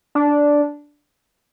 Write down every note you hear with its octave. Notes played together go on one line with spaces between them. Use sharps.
D4